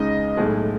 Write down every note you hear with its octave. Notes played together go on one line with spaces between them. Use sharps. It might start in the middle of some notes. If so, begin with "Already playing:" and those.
Already playing: C#2 C#3 G#3 D#4 D#5
B1 A2 G#3